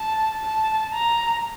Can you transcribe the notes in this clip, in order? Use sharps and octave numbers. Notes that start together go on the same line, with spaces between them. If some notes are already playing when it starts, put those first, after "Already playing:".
Already playing: A5
A5
A#5